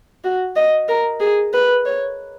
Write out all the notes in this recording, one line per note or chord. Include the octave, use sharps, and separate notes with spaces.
F#4
D#5
A#4
G#4
B4
C#5